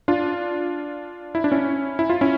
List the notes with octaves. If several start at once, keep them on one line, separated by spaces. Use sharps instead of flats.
D4 F4
E4
D4
C#4 E4
E4
F4
C#4 E4